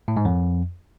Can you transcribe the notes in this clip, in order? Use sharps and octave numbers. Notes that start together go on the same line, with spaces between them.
A2
G#2
F2